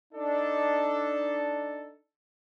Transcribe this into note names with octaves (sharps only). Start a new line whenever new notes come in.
D4 D#4 A4